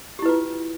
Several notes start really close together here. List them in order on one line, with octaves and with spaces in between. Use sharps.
G4 E4 B4 F4